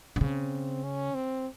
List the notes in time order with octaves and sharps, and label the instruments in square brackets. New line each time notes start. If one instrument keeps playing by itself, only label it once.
[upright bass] D3
[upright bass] C#3 [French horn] C4
[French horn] C#4
C4